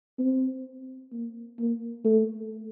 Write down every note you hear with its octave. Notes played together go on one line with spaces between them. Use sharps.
C4
A#3
A#3
A3